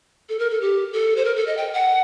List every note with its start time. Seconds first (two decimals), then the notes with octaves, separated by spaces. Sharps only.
0.29 A4
0.39 A#4
0.50 A4
0.61 G4
0.93 A4
1.16 C5
1.25 A#4
1.36 A4
1.47 D#5
1.57 G5
1.74 F#5